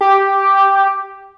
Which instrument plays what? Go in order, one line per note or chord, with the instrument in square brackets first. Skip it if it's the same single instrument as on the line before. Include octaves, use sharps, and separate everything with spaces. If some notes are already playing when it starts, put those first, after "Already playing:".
[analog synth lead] G4